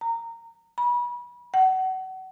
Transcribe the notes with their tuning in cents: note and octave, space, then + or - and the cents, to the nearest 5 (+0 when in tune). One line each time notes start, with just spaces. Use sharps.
A#5 -15
B5 -30
F#5 +30